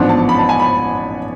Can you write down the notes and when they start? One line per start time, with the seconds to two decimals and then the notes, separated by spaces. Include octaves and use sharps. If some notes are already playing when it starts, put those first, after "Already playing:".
Already playing: A1 G#2 F3 B3 D4 C6
0.09 A5
0.29 B5
0.39 A5
0.49 G#5
0.59 B5